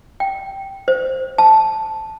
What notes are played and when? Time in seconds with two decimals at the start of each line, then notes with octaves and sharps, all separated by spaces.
0.20 G5
0.88 C5
1.38 A5